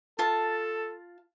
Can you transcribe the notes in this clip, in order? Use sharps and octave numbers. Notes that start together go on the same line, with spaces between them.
F4 A4 A5